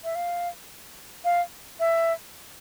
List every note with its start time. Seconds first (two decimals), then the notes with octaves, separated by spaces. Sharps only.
0.04 E5
0.15 F5
1.25 F5
1.80 E5